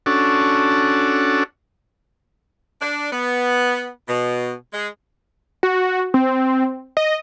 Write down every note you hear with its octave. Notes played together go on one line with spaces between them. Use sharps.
C#4 D4 F#4 A4
D4
B3
B2
G#3
F#4
C4
D#5